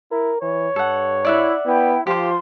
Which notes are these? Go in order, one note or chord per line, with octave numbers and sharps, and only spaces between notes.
E4 A#4
E3 C#5
G2 A4 F#5
E4 D5 E5 F#5
B3 E4 G5
F3 F4 G4 C5 C6